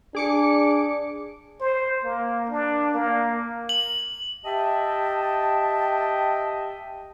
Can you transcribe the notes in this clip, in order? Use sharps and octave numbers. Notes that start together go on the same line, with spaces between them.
D4 G#4 D6 C#7
C5
A#3
D4
A#3
F#7
G4 D#5 E5 G5 A5